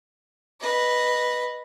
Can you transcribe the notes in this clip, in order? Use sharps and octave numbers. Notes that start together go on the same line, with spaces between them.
B4 D#5